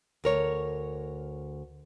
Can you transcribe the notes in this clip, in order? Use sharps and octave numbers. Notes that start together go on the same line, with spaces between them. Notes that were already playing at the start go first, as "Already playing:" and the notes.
D2 A#4 C#5